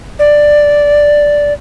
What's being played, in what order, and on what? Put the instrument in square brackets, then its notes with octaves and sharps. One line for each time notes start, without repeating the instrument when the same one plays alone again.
[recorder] D5